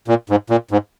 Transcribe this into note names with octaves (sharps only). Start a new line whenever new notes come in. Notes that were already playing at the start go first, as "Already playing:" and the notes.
A#2
G#2
A#2
G#2